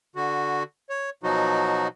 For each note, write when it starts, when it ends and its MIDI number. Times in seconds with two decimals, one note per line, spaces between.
0.16 0.63 50
0.16 0.63 66
0.90 1.10 73
1.23 1.88 47
1.23 1.88 53
1.23 1.88 54
1.23 1.88 63
1.23 1.88 66